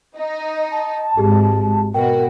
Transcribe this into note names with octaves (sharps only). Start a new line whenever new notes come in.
D#4
A5
G#1 G#2 G4 G#4
B2 F#4 A#4 G5